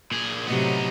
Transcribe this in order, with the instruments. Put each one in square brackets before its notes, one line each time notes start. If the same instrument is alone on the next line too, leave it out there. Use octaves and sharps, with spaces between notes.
[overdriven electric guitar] A#2 G#4
[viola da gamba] A2 C3 F#3 [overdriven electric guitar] B3 D#4